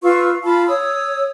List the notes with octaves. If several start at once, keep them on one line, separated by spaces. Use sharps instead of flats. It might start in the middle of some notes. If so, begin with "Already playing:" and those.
F4 B4 C#6 E6
F4 A5 B5
C#5 D#6 E6